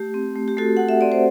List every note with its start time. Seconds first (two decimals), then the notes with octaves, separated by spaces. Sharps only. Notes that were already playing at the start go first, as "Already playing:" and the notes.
Already playing: A3 G4
0.14 C4
0.36 A3
0.48 G4
0.57 A3 F#4 A4
0.77 F#4 F#5
0.89 E5
1.01 C4 D5
1.12 C5